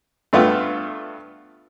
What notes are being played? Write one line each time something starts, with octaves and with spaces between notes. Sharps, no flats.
G2 A3 B3 F4